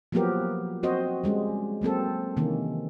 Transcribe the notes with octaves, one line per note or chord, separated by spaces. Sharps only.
F3 F#3 A#3 B3 G4 A#4
C4 F#4 C5 D#5
G3 G#3 C#4
F#3 A#3 C4 A4
C3 D#3 E3 A#3 C#4